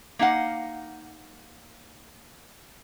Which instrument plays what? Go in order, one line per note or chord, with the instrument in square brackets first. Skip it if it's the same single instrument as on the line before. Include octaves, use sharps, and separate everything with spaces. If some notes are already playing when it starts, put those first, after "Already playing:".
[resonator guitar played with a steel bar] A#3 D#4 F5 F#5